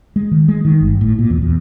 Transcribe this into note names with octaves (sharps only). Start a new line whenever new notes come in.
G#3
D#3
G#3
D#3
G1
A2
A#2
E2
E2